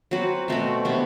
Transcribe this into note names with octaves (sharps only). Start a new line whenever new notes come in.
F#3 C4 F#4 B4
B2 A3 C4 F#4
C3 F#3 B3 D4